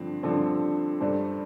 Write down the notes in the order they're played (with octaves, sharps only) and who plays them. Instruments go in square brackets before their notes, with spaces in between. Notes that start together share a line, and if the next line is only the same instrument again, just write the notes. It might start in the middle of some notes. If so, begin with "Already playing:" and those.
Already playing: [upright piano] G2 D3 F3 C4
G2 D3 F3 C4 A4
G2 G3 D4 A4 C5